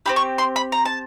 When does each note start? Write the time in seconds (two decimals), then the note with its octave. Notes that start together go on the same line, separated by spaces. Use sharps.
0.06 C4 E4 G4 B5
0.16 C#6
0.38 C6
0.56 B5
0.72 A#5
0.85 A5